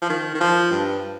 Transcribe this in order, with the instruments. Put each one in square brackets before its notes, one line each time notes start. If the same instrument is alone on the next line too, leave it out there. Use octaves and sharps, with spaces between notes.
[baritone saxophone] F3
D#3
D#3
F3
G2